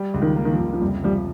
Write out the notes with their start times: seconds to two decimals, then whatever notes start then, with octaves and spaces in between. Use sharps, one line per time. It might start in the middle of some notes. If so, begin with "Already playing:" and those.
Already playing: G3
0.14 C#2
0.22 D#3
0.36 A#3
0.45 D#3
0.51 F3
0.59 C#2
0.73 F3
0.81 F1 G3
1.04 F3 G3